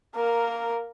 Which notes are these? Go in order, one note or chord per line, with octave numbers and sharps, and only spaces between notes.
A#3 A#4